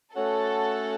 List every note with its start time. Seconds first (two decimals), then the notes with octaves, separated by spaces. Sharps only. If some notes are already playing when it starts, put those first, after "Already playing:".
0.15 A3 C#4 F#4 A4 C#5 F#5